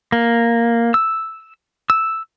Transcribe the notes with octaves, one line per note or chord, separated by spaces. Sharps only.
A#3
E6
E6